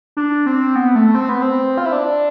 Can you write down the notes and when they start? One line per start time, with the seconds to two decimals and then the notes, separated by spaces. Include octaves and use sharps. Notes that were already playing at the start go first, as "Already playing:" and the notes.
0.17 D4
0.46 C4
0.75 B3
0.95 A3
1.15 C4
1.29 B3
1.42 C4
1.77 F4
1.85 E4
1.92 D4